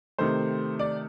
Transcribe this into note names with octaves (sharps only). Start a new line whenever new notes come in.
C3 D#3 A3 C5
D5